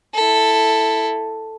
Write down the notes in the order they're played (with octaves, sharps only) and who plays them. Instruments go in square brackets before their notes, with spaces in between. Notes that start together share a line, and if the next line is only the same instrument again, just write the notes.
[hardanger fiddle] E4 A4